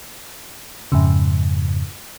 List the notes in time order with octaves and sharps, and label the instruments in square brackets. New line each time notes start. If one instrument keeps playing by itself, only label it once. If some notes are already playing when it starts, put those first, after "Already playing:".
[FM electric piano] F2 G#2 C#3